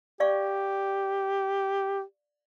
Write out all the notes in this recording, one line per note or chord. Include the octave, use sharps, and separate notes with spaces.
G4 D5 F5 C#6